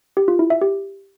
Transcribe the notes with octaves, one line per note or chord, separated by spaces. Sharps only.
G4
F4
E4
E5
G4